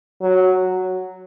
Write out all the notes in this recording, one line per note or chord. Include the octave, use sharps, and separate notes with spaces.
F#3